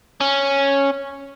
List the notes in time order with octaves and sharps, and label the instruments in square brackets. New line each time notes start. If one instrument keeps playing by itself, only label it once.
[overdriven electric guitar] C#4